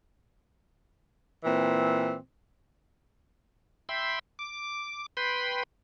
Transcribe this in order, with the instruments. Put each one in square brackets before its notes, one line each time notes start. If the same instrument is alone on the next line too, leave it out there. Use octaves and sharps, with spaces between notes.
[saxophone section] A#2 E3 C4
[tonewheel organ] E5 G5 B5 C6
D6
B4 G5 B5 C6